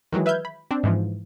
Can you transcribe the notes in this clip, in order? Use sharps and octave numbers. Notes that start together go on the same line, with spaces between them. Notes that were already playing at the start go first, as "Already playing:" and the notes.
D#3 E3 F#3 G#3
B4 E5 F6 G6 G#6
B5
C4 D4
G#2 E3 F3